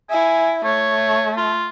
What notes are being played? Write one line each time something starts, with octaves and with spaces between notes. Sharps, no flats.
E4 G#5
A3 C#5
F4